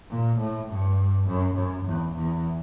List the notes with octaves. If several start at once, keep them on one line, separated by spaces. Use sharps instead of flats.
A#2
A2
G2
F#2
F#2
E2
E2